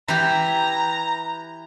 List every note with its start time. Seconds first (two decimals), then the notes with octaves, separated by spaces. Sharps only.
0.08 E3 G4 A#5